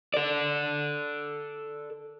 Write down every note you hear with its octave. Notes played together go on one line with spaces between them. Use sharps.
A4 D5